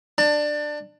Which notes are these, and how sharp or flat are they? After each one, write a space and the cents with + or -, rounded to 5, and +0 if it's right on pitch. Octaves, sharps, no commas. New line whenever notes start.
D4 +15 A5 +25